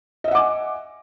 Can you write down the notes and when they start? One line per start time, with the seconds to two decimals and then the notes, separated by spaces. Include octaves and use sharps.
0.24 D#5
0.28 E5
0.31 F#5
0.35 D6
0.38 G#5